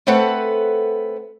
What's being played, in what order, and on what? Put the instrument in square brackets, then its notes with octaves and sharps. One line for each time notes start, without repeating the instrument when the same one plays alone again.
[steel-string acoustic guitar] A3 B3 C4 A4 B4 F#5